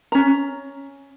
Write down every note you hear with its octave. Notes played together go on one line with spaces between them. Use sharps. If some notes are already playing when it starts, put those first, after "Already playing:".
C#4 A#5